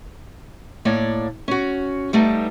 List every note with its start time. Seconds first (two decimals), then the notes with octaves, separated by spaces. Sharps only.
0.85 A2 A#3 C#5 D5
1.48 C#4 F#4
2.13 G3 A3 B3 D#4